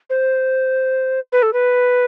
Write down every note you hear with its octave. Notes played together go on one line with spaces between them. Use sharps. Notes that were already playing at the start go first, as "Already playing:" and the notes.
C5
B4
A4
B4